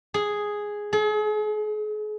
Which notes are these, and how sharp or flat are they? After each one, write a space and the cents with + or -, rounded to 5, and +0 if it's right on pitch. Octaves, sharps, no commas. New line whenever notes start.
G#4 +0
G#4 +40